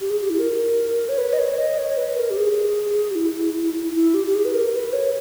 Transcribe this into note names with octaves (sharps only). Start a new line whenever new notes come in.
G4
G#4
G4
E4
A#4
C#5
B4
D#5
C#5
D#5
C#5
B4
A#4
G4
G#4
G4
E4
E4
G4
G4
G#4
B4
A#4
B4
C#5